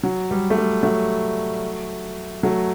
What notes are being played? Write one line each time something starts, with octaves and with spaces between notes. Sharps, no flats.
F#3
G3
A3
G3
F#3 A3
F#3 A3